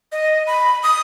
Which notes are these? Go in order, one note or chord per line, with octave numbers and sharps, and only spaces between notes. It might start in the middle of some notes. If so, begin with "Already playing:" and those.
D#5
B5
D#6